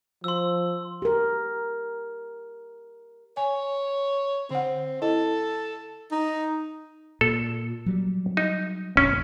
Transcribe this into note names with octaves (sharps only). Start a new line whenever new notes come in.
F3 C6 E6
G4 A#4
C#5 G#5
D3 C4 F#5
E4 A4 D#5
D#4
A#2 A4
F#3 G3
D#4
F1 A#1 C#4